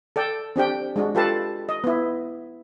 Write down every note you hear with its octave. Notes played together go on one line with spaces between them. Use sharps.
A4 D5 G5
C4 D4 G4 G5
G#3 D4 F#4
F4 G4 A4 B4 F5 A5
D#5
B3 E4